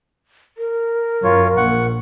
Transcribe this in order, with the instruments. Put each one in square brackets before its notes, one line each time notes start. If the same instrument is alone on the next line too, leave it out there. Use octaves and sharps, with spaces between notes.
[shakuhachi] A#4
[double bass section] F#2 [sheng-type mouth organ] F4 C#5
[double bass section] A#1 [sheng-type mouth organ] F#5 C#6